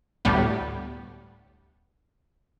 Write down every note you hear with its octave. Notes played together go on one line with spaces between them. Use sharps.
D2 A2 G3 B3